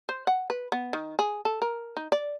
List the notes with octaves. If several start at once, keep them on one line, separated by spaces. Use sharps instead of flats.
C5
F#5
B4
B3
D#3
G#4
A4
A#4
D#4
D5